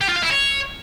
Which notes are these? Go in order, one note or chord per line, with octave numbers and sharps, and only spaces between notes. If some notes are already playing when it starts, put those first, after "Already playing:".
G4
F4
F5
E4
C#5